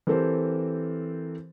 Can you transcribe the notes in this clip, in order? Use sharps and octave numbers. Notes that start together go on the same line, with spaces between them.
E3 C4 G4 A4 A#4 C5